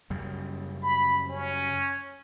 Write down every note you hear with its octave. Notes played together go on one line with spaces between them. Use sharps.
F#2 C#3 G3
B5
C#4